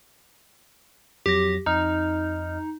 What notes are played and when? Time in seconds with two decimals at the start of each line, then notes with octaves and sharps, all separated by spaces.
1.26 F2 F#3 G4 A#6
1.66 F2 D#4 D#5 F6